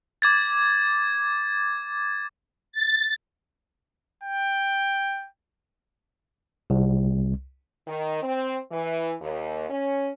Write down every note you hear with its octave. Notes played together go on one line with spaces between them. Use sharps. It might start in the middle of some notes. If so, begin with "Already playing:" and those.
D6 G#6 A6
A6
G5
C2
D#3
C4
E3
D#2
C#4